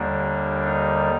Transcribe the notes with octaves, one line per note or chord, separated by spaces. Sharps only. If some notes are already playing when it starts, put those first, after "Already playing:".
Already playing: D#2 D3 G3 A#3 D4
D#4